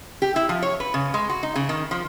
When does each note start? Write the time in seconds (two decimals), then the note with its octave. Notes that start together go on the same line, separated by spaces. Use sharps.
0.22 G4
0.36 E4
0.49 F3
0.62 C#5
0.80 B4
0.94 C#3
1.14 G#3
1.29 F#4
1.43 D#4
1.56 C#3
1.69 D#3
1.91 F3